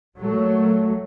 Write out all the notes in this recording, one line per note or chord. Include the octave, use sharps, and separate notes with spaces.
A#2 F#3 A3